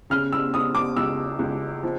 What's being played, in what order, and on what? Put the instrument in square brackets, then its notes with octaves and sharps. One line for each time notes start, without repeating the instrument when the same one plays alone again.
[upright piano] C#3 F6
E6
C#3 D#6
D6
C#2 E6
C#2
F3